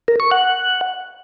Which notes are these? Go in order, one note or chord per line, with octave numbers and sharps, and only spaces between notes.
A#4
C#6
F#5